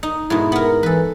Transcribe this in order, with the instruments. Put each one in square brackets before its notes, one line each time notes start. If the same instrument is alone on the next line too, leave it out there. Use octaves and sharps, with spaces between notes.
[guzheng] D#4
[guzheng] G#2 B2 [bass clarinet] E4
[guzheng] B3 A#4
[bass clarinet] E3 [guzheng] A4 B4